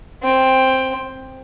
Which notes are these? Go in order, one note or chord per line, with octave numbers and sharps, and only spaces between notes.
C4 G5